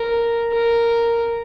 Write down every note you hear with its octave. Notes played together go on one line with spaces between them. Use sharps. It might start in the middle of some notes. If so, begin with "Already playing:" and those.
Already playing: A#4
A#4